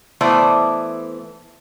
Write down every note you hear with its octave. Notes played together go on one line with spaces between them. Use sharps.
E3 A3 B3 C5 D5